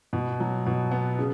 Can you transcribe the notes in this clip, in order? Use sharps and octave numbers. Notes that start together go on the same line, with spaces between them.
B2
F#3
B2
B3
C#3